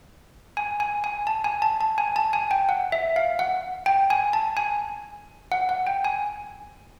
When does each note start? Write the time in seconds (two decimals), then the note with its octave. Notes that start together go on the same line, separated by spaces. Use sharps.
0.57 G#5
0.80 G#5
1.04 G#5
1.27 A5
1.44 G#5
1.62 A5
1.81 A5
1.98 G#5
2.16 A5
2.33 G#5
2.51 G5
2.69 F#5
2.92 E5
3.16 F5
3.39 F#5
3.86 G5
4.10 G#5
4.33 A5
4.57 G#5
5.52 F#5
5.69 F#5
5.87 G5
6.05 G#5